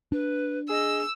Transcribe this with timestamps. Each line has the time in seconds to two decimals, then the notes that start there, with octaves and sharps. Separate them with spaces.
0.12 D4 B4
0.69 G#4 D#5 E6